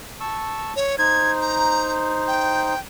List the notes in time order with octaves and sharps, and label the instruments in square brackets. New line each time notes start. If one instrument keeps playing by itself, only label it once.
[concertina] A5 C#6 E6
[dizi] C#5
[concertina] D#4 C5 [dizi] G#6
[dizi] A#5
G5